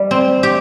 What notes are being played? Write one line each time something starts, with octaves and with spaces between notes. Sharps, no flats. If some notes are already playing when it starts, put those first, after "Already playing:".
Already playing: G3
C4
G4